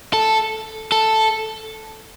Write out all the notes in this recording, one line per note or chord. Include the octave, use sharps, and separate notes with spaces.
A4
A4